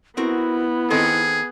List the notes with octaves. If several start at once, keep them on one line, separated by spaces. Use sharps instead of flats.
B3 C4 E4 F#4 A#4
D#3 C4 G#4 A4